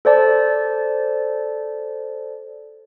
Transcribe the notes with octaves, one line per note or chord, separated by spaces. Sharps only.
A4 C5 D5 A5